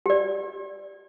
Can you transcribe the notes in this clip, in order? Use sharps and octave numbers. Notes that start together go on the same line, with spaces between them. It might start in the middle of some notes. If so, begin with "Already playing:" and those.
G4 D5